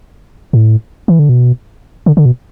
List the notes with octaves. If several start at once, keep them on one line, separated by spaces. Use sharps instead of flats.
A2
E3
D3
B2
D3
D3
B2